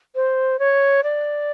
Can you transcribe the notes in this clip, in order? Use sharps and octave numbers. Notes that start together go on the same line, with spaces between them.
C5
C#5
D5